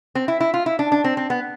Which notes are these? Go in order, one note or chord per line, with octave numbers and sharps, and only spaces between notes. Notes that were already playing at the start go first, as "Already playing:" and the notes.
C4
E4
E4
F4
E4
D4
D4
C4
C4
B3